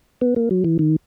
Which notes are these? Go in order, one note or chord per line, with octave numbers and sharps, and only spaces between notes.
B3
A#3
F#3
E3
D#3